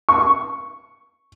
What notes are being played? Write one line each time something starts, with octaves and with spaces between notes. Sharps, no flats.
C#6